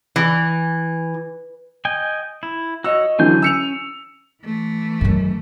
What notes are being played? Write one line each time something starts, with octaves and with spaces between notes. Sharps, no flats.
E3
D#5 G5 G#5
E4
F#4 C#5 D#5 E6
D3 E3 F#3 C#4 G#5 G6
E6 C#7 F7
E3 A3
F#2 D#3